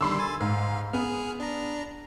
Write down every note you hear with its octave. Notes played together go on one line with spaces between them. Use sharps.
D3 D#3 G3 B5 C6 E6
G#5 A6
G#2 F5
B3 G#4 F6
D4 A#5